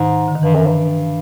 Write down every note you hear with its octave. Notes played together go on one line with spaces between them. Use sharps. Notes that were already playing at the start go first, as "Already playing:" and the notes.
Already playing: G#2 D#3
D3
D#3
G2 E3
F#2
G2